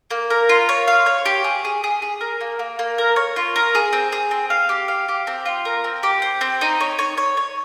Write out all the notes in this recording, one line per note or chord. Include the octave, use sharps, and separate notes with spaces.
A#3
A#4
F4
C#5
F5
C#5
G4
G#4
G#4
G#4
G#4
A#4
A#3
A#3
A#3
A#4
C#5
F4
A#4
G#4
C4
G#4
C4
F5
G4
F5
G4
C4
F4
A#4
C4
G4
C5
C4
D#4
C#5
C#5
C#5
C#5